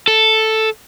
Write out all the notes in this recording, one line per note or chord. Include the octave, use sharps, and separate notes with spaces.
A4